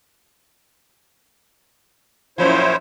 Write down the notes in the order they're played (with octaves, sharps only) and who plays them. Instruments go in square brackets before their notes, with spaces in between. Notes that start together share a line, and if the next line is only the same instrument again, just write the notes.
[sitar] F#2 A#2 F3 [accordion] E4 C5 C#5